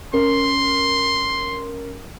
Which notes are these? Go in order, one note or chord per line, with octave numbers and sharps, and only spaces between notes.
C#4 A#4 C6